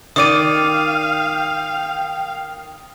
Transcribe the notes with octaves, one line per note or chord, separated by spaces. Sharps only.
D#3 D5 F5 G5 D#6 D#7